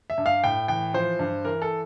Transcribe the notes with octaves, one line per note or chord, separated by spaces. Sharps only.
E5
G2
F5
A2 G5
E3 G5
F3 C5
G2
E3 A#4
A4